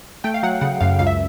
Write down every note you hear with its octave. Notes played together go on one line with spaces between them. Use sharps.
A3 G5
F5
F#3 F#5
C#3 F#5
F#2 F5
C#2 F5
E5